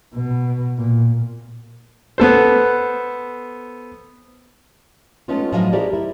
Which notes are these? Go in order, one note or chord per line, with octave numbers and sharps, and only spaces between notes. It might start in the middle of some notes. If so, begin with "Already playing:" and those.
B2
A#2
B3 A4 C5
G#3 A3 B3 C#4 D#4 F4
A2 F3 F#3 D#5 F5 G#5
E4 G4 G#4 A#4 C5 D5
E4